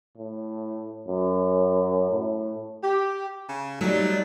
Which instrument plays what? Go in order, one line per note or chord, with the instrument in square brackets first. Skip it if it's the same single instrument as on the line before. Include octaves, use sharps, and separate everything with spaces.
[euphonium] A2
F#2
A2
[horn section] G4
[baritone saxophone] C#3
[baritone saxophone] F#3 [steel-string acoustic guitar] G3 A3 [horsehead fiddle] D#4 D5